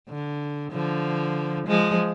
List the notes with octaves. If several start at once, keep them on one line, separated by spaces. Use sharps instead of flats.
D3
D3 F3
F3 G#3